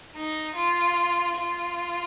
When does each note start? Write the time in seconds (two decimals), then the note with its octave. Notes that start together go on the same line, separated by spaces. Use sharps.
0.16 D#4
0.56 F4
1.36 F4